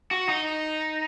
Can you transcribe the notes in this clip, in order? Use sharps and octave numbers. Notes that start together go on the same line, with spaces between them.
F#4
D#4